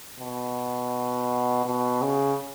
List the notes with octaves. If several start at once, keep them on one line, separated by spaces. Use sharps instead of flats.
B2
B2
C#3